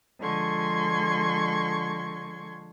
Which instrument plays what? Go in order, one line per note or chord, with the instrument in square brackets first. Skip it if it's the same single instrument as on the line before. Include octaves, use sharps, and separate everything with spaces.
[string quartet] D3 F3 G#3 C6 C#6 G#6